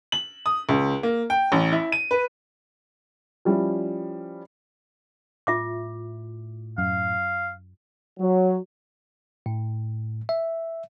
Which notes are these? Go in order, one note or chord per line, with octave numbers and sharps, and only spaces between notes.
F#7
D#6
C#2
A#3
G5
A1
E4
D#7
B4
F3 G3 C#4 E4 G4
A2 F4 E5 D6
F#2 F5
F#3
A2
E5